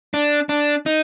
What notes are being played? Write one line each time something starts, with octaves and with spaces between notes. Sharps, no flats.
D4
D4
D#4